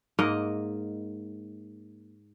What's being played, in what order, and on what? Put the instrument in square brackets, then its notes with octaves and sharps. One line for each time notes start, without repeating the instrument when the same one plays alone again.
[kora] G#2 A#3 A#4 D#5